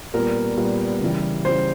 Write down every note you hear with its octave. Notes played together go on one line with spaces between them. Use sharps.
A#2 G3 B3 A#4
A#2 G3 B3
C#3 E3 G3
C#3 E3 G3 C5